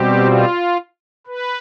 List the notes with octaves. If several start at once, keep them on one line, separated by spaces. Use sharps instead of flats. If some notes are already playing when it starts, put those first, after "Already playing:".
Already playing: B2 G3 C4 G4
F4
B4